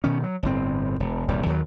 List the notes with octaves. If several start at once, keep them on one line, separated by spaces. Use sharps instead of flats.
B2 D#3 C#4
F#3
G1 A2 C4
E1
D#1 C2 G2 G3
D#2 D#3 E3 F#3